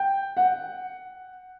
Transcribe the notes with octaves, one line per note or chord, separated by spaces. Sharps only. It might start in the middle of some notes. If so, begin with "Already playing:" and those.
Already playing: G5
F#5